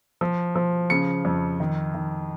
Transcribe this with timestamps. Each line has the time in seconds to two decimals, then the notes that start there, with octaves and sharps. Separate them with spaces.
0.21 F3
0.56 F3
0.90 C#3 C#7
1.25 F2
1.60 D#3
1.94 D#3